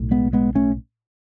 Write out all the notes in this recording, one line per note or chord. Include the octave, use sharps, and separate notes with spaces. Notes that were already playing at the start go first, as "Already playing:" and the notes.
Already playing: B1 A2
G#3 B3
G#3 B3
A3 C#4